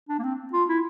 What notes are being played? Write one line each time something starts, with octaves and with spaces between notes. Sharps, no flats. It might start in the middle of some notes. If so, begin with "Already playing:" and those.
D4
A#3
C4
F4
E4